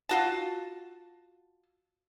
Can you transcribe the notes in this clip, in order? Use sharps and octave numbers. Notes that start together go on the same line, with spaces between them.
F4 F#4 A5